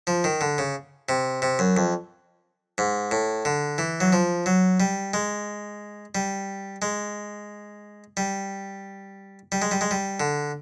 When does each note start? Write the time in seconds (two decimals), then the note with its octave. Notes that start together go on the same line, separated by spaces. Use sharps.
0.07 F3
0.24 D#3
0.41 D3
0.58 C#3
1.09 C3
1.42 C3
1.59 F#2
1.77 F2
2.78 G#2
3.11 A2
3.45 D3
3.78 E3
4.01 F#3
4.13 F3
4.46 F#3
4.80 G3
5.14 G#3
6.15 G3
6.82 G#3
8.17 G3
9.52 G3
9.62 G#3
9.71 G3
9.81 G#3
9.91 G3
10.20 D3